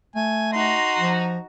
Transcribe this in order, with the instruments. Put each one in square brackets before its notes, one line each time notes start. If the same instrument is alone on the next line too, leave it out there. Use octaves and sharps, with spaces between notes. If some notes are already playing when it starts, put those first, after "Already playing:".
[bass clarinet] A3 [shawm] G#5
[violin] D#4 F#4 [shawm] C6
[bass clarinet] F3